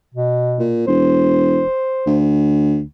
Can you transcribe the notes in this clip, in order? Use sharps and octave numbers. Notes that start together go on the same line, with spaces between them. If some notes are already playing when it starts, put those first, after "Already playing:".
B2
A#2
E1 C5
D2